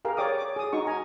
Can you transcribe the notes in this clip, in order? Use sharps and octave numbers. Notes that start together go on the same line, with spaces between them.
G4 G#4 A#4 F5
C#5 D5 G5 D6 D#6
D6
G#4 D#6
D#4 F#4 C#6
G#5 A#5